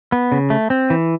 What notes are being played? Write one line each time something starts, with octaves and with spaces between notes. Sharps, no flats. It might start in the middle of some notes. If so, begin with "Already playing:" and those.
B3
C#3
A3
C4
E3